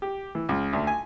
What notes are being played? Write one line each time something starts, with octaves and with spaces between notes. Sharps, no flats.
G4
E3
C#2
D2
G#5